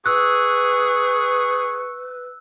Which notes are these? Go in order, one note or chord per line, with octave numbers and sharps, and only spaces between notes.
G#4 B4 C#6 E6 F#6